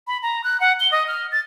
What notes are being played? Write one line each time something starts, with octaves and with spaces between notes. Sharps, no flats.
B5
A#5
F#6
F#5
G7
D#5
F6
A6